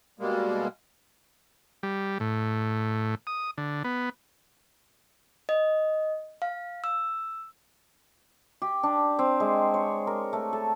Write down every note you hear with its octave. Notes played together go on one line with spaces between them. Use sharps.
B2 G3 G#3 A#3
G3
A2
D#6
D3
B3
D#5
F5
E6
G4
D4
C4
G#3
C#5
A#4
A3
A4